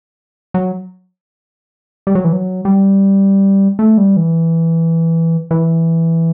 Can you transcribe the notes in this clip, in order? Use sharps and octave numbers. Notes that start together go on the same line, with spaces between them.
F#3
G3
F#3
E3
F#3
G3
A3
G3
E3
E3